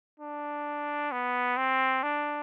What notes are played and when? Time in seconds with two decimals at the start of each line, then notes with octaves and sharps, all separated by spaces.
0.20 D4
1.12 B3
1.57 C4
2.03 D4